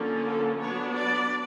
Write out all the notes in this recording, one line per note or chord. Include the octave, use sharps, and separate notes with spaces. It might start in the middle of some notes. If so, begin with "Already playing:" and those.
Already playing: D3 F3 A#3 C#4
A4
F#3 B3 D4 C#5
D5